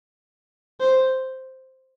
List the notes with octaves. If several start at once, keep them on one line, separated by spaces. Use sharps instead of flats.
C5